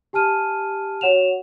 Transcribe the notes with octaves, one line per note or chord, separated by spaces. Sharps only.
G4 G#5 A5 F6 D#7
F#4 C#5 F#5 E7 F7